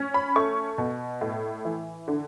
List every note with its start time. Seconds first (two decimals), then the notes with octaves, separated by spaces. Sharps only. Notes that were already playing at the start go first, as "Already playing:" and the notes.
Already playing: C#4
0.14 B5
0.36 A3 C#6
0.78 B2
1.21 A2
1.65 E3
2.08 D3